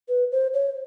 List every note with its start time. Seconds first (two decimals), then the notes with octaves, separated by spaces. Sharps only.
0.09 B4
0.32 C5
0.54 C#5